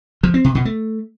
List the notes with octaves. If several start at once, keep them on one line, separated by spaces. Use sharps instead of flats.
F3
C4
C3
B2
A3